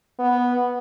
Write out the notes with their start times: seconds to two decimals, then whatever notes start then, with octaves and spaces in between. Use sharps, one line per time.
0.19 B3